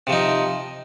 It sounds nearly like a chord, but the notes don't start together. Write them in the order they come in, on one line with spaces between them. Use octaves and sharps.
C3 F3 D#4